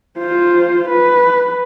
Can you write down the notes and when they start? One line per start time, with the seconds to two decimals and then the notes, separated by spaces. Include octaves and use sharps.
0.19 F4 C5
0.89 B4